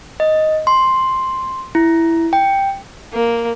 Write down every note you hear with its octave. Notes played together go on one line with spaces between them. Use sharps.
D#5
C6
E4
G5
A#3